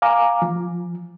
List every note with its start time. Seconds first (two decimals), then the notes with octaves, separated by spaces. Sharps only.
0.02 F5 G#5 A#5 D6
0.42 F3